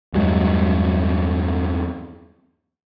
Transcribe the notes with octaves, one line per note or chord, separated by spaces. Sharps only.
E2 G2 F#3 G#3